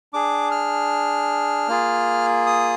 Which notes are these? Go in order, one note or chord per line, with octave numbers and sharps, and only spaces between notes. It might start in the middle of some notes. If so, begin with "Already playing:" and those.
D4 G#4 D6
F6
A#3 F4 G#4
D#6